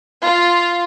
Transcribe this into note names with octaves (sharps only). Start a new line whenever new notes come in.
F4